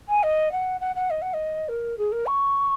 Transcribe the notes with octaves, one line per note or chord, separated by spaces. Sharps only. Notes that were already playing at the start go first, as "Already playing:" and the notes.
G#5
D#5
F#5
F#5
F#5
D#5
F#5
D#5
A#4
G#4
A#4
C#6